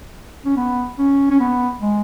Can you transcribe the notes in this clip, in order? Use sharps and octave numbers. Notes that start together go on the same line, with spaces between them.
C#4
B3
C#4
C#4
B3
G#3